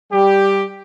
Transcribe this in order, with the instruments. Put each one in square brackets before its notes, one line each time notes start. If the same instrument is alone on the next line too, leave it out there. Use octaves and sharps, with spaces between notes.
[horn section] G3 G4